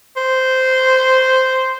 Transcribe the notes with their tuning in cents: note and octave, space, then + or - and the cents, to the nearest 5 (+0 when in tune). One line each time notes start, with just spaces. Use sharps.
C5 -10